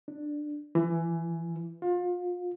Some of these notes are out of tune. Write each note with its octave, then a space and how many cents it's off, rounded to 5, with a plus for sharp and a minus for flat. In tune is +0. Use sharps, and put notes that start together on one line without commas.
D4 +10
E3 +20
F4 +30